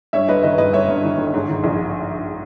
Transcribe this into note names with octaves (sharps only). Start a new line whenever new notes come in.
G2 C#5 E5
G1 B4 D#5
D#3 B4 D#5
G2 B4 D#5
G1 C#5 E5
G2
D#3
G1
G#2
D#3
A#1